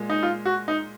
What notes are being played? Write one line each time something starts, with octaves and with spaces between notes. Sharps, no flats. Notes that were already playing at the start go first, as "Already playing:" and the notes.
Already playing: A#2 G#3
D#4
F4
F#4
D#4